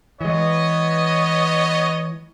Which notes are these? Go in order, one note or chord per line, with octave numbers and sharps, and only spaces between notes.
E3 G#3 B3 C#5 D#5